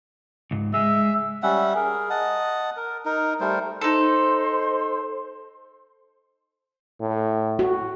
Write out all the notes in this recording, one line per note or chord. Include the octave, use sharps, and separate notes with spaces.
C#2 G#2
G#3 E5
G3 C#4 E5 F#5
G#4 A#4
D#5 F#5 A5
A#4
D#4 A#4
G3 A3 A#4 C5
D#4 A4 C5 C6
A2
F#4